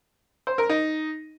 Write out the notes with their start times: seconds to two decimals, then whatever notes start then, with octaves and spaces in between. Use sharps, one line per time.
0.47 C5
0.58 A#4
0.69 D#4